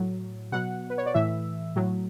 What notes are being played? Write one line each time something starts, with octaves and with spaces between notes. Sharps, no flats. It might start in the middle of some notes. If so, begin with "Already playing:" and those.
Already playing: A2 F#3
B2 F#3 F#5
B4
C#5
D5
A2 E3 E5
A2 F#3